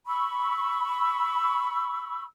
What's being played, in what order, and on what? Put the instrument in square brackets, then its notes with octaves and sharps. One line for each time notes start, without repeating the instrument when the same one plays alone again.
[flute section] B5 C#6 E6